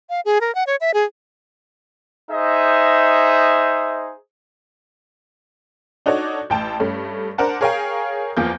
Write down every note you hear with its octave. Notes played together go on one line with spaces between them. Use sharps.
F5
G#4
A#4
F#5
C#5
E5
G#4
D#4 G#4 C5 D#5 E5
D4 D#4 F#4 A4 C#5 D5
A1 G5 A5
G2 A3 C#4
D4 A#4 C5 F#5 A5
G#4 A#4 C#5 F5 G5 G#5
E2 F3 A#3 G6